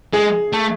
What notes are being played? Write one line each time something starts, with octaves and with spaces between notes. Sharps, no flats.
G#3 G#4
A3